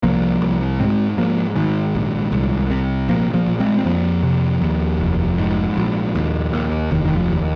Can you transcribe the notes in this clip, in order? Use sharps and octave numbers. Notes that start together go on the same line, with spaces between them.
C2 F3 A#3
C2
G#2 G#3 C4
G#2 F3 A#3
G#2 D#3 G#3
A#1
C2
C3
A#1 F3 A#3
F3 A#3
A#1
G#3 C4
C4
F2 F3 A#3
C3
D#2
F1
G#2
A#1
D#2
D#2
F1 D#3
D#3
F3
D#2